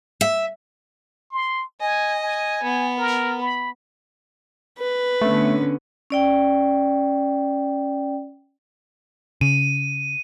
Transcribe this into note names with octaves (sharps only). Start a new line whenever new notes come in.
E5
C6
D#5 G#5
G#5
B3
A#4
B5
B4
D3 A3 B3 C#4
C#4 D5 G5
C#3 D#7